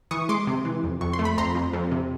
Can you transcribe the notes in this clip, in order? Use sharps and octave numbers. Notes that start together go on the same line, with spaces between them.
E3 C#6 D#6
G#3 C6 D6
C3
E3
F2
F2 C#6
C6
A3
B5
F2 A#5 C6
F2
F2
C3